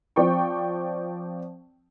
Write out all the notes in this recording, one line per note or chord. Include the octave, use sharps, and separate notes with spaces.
F3 C4 D5 G5 C#6